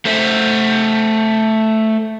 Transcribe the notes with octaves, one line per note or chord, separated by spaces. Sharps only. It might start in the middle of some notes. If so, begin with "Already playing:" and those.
A3 C5 E5